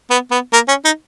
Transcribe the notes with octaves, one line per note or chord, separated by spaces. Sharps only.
B3
B3
A#3
C#4
D#4